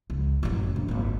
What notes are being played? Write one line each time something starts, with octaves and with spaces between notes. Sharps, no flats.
C#2
A1 F#2
A#1
G#1 A#3